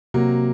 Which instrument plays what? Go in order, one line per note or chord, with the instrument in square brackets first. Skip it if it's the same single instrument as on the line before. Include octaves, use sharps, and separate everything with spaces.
[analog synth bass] C3 [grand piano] F#3 A#3